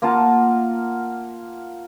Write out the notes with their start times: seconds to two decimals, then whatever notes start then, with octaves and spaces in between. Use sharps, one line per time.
0.02 A#3 F4 F#5 A5